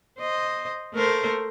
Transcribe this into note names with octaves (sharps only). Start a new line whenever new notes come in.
C5 D#5
A3 A#4 C5